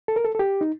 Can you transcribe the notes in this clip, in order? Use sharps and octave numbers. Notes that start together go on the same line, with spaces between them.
A4
A#4
A4
A4
G4
D#4